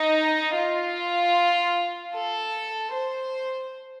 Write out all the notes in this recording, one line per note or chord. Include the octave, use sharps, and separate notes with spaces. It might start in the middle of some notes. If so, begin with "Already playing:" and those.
Already playing: D#4
F4
A4
C5